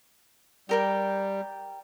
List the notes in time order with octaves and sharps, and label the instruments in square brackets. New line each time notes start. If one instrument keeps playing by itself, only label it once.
[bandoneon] G3 [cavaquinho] G4 A#4 G5